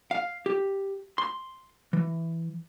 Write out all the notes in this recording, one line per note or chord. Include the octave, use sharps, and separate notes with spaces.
F5
G4
C6
E3